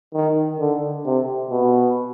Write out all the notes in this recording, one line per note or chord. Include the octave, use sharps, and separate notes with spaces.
D#3
D3
C3
B2